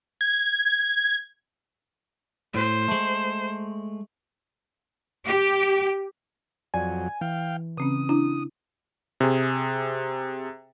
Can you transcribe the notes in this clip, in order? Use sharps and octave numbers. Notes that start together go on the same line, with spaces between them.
G#6
A2 C5
G#3 A3
G4
F2 F#3 D5 G#5
E3 F5 G5
C#3 C4 C#4 D#6
D4 E4
C3 G#4